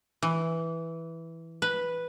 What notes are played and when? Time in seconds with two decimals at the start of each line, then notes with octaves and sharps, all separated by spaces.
0.22 E3
1.62 B4